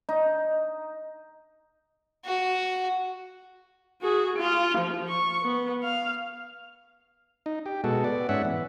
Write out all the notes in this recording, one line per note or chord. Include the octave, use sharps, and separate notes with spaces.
D#4
F#4
F#4 G#4
F4
F3
C#6
B3
F5
D#4
G4
B2 G#3 F#4 A4
B3 D5
G#2 C#4 E5 F#5
E3